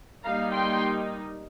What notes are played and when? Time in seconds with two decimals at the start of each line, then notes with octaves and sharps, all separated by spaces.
0.24 G3 A#3 D#4 F5 A#5
0.52 G5 C6